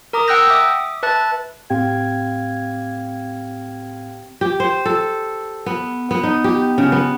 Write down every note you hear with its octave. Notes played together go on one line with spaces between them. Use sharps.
A#4 A#5 D6 D#6
F#5 G5 E6 F#6 G6 A#6
E5 D6 D#6
B4 E5 A5 F#6 A6
A2 C4 G4 F5 G5 G#6
G4
C5
A4
B3
B3
D#4
G4
C#3
B3